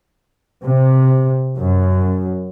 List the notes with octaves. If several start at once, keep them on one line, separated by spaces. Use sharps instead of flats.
C3
F#2